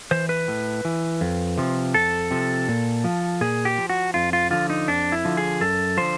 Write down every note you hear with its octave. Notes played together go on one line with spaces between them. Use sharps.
E3 C5
B4
A2
E3
F2
C3 F3
F2 A4
C3 F3
A#2
F3
A#2 G#4
G4
F3
F#4
F2 F4
F4
D3 F3 F4
D#4
F2 D4
E4
D3 F3
G#4
F#2 A4
D3 F3 C5